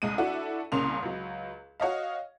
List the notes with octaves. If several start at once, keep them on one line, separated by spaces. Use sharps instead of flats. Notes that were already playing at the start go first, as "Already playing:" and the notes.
C2 G#3 D#7
D4 E4 F#4 A4
C2 C#3 A#3 C#4 C6 F7
C#2 F#3
F#4 C#5 D#5 F5